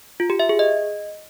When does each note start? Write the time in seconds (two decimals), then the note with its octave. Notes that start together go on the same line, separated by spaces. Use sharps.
0.20 F4
0.30 G4
0.40 E5
0.49 G#4
0.59 D#5